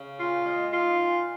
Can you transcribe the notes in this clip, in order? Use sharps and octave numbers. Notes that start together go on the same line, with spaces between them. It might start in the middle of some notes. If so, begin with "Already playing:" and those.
Already playing: C#3
A#2 F4
G#3
D#4 F4
A#2